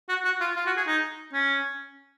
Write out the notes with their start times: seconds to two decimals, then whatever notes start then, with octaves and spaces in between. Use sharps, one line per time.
0.09 F#4
0.25 F#4
0.41 F4
0.56 F4
0.66 F#4
0.77 G#4
0.87 D#4
1.33 C#4